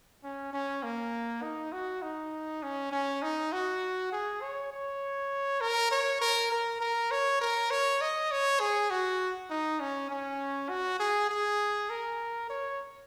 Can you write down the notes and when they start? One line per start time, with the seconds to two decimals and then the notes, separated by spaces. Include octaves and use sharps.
0.23 C#4
0.53 C#4
0.83 A#3
1.42 D#4
1.72 F#4
2.02 D#4
2.63 C#4
2.92 C#4
3.22 D#4
3.53 F#4
4.12 G#4
4.42 C#5
4.72 C#5
5.61 A#4
5.91 C#5
6.21 A#4
6.52 A#4
6.81 A#4
7.11 C#5
7.41 A#4
7.71 C#5
8.01 D#5
8.31 C#5
8.60 G#4
8.90 F#4
9.50 D#4
9.80 C#4
10.10 C#4
10.69 F#4
11.00 G#4
11.30 G#4
11.90 A#4
12.50 C#5